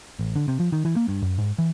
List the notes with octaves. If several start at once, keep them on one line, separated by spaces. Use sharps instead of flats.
A1
D3
C3
F3
D#3
E3
A#3
G2
F#2
G#2
E3